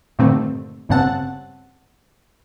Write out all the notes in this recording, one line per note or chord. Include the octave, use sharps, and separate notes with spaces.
G2 A#2 D3 D#3 A3 C4
G1 G2 C#3 C4 F#5 A5